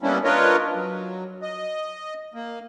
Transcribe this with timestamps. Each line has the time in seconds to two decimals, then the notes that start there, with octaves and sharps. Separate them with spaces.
0.02 G3 A#3 B3 C#4 D4 E4
0.24 D4 F4 A#4 B4 C#5 D#5
0.74 F#3
1.42 D#5
2.34 A#3